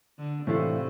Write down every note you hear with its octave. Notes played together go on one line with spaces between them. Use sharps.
D3
A2 C3 E3 A3 D4 F4